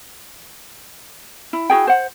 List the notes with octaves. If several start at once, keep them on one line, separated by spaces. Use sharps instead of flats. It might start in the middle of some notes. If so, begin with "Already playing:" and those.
E4
E4 F#4 G#4 G5
C5 F#5